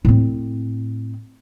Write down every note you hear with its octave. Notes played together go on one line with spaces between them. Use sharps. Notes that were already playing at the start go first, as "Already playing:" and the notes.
A2 C4